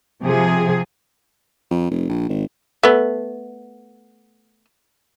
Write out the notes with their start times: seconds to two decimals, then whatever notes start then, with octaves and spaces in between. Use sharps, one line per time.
0.23 C3 F3 G#4
1.71 F2
1.91 F1
2.09 A#1
2.29 G#1
2.83 A3 B3